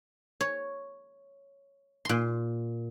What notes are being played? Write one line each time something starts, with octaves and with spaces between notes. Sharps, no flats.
C#5
A#2 C6